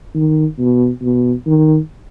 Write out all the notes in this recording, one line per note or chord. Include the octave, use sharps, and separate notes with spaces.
D#3
B2
B2
D#3